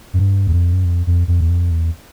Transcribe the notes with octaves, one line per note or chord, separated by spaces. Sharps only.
F#2
G2
E2
F2
F#2
F2
F2
F2
E2
F2
E2